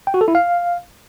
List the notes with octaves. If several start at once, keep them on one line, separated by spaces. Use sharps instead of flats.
G5
F#4
A4
E4
F5